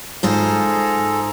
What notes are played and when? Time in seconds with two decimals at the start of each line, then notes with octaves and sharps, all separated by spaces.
0.23 G#2 F4 G#4 A4 C5 A#5